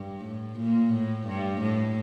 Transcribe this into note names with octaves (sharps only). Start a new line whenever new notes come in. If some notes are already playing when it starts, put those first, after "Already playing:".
Already playing: G2
A2
A#2
A2
G2
A2